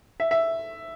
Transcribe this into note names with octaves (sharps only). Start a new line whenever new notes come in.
E5
E5